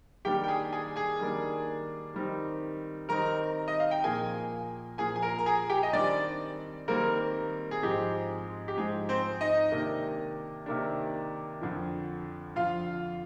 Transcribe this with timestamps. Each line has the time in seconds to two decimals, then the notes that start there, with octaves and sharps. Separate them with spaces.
0.25 D#3 G3 A#3 D4 G4 G5
0.44 G5
0.48 G#4 G#5
0.73 G#4 G#5
0.96 G#4 G#5
1.19 D#3 G3 A#3 D4
2.14 D#3 G3 C4 D#4
3.09 D#3 G3 C4 D#4 A#4 A#5
3.68 D#5
3.80 F5
3.91 G5
4.04 A#2 F3 A#3 G#4 G#5
4.98 A#2 F3 A#3 G#4 G#5
5.16 G#5
5.22 A#4 A#5
5.39 A#5
5.46 G#4 G#5
5.70 G4 G5
5.83 D#5
5.93 D#3 G3 C4 D4 D5
6.88 D#3 G3 A#3 C4 A#4
7.71 G#4
7.82 G#2 F3 G#3 C4 G4
8.68 G4
8.77 G#2 F3 G#3 C4 G#4
9.09 C4 C5
9.41 D#4 D#5
9.72 C3 D#3 A#3 D4
10.66 C3 D#3 A#3 D4
11.61 F2 D3 F3
12.56 F2 D3 F3 F4 F5